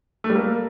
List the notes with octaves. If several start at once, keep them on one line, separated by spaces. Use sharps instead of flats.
A3
G3
A#3